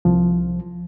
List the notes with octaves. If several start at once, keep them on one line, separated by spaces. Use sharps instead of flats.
C2 F3